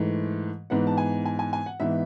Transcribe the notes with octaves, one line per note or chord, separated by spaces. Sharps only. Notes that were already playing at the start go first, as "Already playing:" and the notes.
Already playing: G#2 E3 A3
G#2 E3 B3 F#5
A5
G#5
G#5
G#5
G#5
F#5
G#2 E3 B3 E5